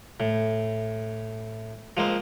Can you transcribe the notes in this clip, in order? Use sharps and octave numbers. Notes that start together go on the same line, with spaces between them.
A2
F3 G#3 A#3 C4